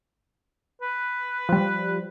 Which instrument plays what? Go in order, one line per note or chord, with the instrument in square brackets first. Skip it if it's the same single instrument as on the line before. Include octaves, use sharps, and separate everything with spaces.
[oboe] B4
[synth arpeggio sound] F3 G3